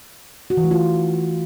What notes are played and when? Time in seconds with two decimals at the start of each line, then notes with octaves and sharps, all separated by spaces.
0.50 F#4
0.57 E3
0.64 A3
0.71 F4